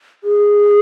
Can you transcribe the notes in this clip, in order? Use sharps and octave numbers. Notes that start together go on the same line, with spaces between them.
G#4